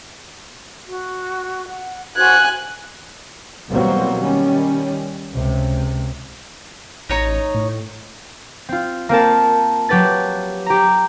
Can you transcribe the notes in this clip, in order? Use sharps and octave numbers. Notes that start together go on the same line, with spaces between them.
F#4
F#5
F#4 C5 G#5 F#6 G#6
B2 E3 F#3 G3 A#3 C4
D#3 G3 C#4
C#2 C3
A1 D#4 C#5 A#5
A2
C4 F4
A#3 C4 A#4 A5
F#3 G4 B4 A6
G4 A#5